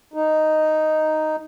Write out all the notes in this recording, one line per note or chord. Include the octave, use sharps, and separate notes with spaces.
D#4